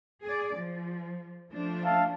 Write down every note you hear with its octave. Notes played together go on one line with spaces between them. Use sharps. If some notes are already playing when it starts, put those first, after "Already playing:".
G#4 D5
F3
F3 A3 D4
E5 F5 A5